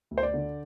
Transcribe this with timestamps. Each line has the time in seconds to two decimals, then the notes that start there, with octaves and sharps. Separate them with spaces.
0.11 D2
0.18 C5
0.23 D5
0.34 D3